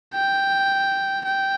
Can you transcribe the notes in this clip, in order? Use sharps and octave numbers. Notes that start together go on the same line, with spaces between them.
G5
G5